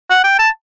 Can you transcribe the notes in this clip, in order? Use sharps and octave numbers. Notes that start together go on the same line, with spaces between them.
F#5
G5
A5